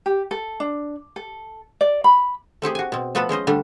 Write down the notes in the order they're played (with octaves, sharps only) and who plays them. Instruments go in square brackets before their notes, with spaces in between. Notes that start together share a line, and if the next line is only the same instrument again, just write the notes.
[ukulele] G4
A4
D4
A4
D5
B5
[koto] A3 C4 G4 G#4
F#4 G#5
B2 C4
F3 A3 B3 A4 B4
G#3 C#4 C5 D#5
D3 G3 A3 D4